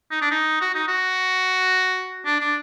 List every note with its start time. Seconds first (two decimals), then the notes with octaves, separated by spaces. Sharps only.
0.11 D#4
0.22 D4
0.31 D#4
0.61 F#4
0.75 D#4
0.88 F#4
2.25 D4
2.40 D4